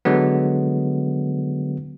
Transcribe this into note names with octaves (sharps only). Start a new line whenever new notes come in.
D3 F#3 G#3 B3